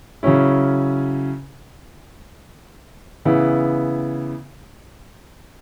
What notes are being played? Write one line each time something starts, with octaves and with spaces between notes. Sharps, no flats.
C#3 F#3 C#4 E4
C#3 E3 B3 E4